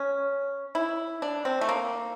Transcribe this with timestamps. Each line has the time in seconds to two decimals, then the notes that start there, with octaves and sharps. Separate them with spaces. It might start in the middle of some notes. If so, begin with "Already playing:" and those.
Already playing: C#4
0.75 E4
1.22 D4
1.45 C4
1.61 A3
1.69 A#3